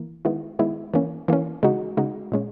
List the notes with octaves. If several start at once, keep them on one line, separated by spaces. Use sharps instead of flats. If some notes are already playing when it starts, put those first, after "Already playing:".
Already playing: E3 A#3
D#3 G#3 B3 E4
D#3 G#3 B3 E4
E3 A#3 C#4
E3 A#3 C#4
C#3 G#3 D#4 F#4
C#3 G#3 D#4 F#4
A#2 G#3 C#4